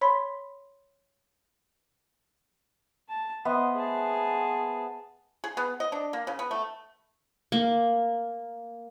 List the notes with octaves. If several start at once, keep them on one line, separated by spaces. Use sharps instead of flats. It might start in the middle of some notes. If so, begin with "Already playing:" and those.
C#5 B5 C6 B6
A5
B3 C5 D#5 E5
G#4 A5
G#4
B3
D#5
D4
A#3
C#3
B3
A3
A#3